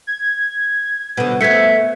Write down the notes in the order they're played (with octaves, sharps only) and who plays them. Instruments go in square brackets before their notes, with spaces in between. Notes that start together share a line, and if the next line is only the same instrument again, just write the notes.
[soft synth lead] G#6
[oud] B2 D3 [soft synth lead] B3
[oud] A3 B3 [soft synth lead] E5 [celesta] G#6 B6 C#7